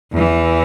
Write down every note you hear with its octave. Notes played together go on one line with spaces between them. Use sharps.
E2
E3